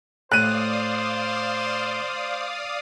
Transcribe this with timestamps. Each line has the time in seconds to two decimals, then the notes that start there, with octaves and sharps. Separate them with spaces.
0.32 A2 C5 D5 F5 D#6 F#6 D#7